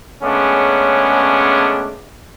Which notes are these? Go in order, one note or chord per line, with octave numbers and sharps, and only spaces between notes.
C#3 G#3 A3 B3 C#4 D4